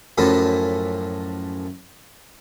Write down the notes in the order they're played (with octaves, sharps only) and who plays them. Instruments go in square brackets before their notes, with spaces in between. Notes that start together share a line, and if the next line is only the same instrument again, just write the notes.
[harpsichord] F#2 A2 F3 A3